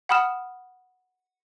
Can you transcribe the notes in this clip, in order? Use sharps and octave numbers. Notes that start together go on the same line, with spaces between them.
F#5 G5 B5 D#6 F6 E7